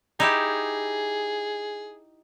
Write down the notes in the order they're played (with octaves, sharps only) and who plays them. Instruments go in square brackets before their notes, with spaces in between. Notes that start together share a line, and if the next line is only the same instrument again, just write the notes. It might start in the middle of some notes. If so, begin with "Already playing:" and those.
[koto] D#4 E4 G4 [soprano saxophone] G#4